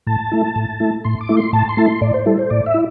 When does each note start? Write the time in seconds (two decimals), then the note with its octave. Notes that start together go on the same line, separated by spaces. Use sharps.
0.07 A2 A5
0.31 A3 E4
0.56 A2
0.80 A3 E4
1.04 A2 C6
1.21 D6
1.29 A3 E4
1.37 C6
1.53 A2 A5
1.69 C6
1.77 A3 E4 A5
1.86 C6
2.01 A2 D5
2.14 C5
2.26 G3 E4 A4
2.39 C5
2.50 A2 D5
2.66 E5
2.74 E4